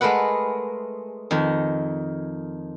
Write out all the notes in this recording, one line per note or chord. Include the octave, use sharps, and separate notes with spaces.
G#3 A3 A#4 B4 F#5
F2 D#3